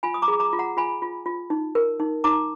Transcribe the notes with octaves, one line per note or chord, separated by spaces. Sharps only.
F4 G#5 B5
D#6
A#5 D6
G#4
A#5 D6
F4
F#5 A#5
F4 G#5 B5
F4
F4
D#4
A#4
D#4
D#4 A#5 D6